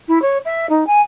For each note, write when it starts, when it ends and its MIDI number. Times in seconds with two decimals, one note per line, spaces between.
0.08 0.21 64
0.22 0.38 73
0.45 0.66 76
0.69 0.86 63
0.86 1.01 80